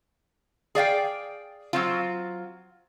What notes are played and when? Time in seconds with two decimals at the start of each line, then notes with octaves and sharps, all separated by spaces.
0.75 G#4 D5 F5 G5
1.73 F#3 C4 F4